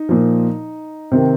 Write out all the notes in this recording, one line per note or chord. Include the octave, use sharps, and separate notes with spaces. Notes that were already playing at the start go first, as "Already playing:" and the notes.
Already playing: D#4
A#2 F3
C3 D#3 C4